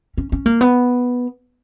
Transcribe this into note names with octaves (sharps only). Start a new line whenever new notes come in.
C#4
C#4
A#3
B3